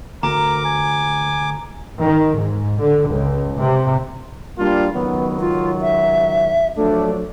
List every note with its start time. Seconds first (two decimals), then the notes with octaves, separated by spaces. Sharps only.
0.23 D2 A#4 A#5 D6
0.65 G#5
2.02 D#3
2.39 G#2
2.80 D3
3.10 C#2
3.57 C3
4.59 G3 A#3 D4 F4
4.93 C#2 D#3 F#3 B3
5.40 F4
5.81 E5
6.77 F3 F#3 A3 D4